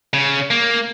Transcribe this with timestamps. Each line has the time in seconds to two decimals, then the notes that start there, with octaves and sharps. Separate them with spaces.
0.14 C#3
0.51 A#3